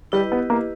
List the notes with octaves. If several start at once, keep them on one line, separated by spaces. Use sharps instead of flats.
G3 E4 G4 B4 D#5
B3
A#3